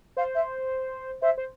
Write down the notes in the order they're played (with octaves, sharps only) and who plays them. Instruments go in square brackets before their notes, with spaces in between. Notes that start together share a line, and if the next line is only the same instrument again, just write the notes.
[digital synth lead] C5 [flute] F5
[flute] E5
[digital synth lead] C5 [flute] E5
[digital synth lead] C5